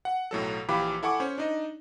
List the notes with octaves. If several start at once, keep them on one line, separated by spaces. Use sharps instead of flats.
F#5
B1 A2 F#3 A4
A#1 E3 G4 F5 B5 D6
E4 A4 F#5 G#5 C#6 D6
C#4 C5 C#5
D4 D#4 D#5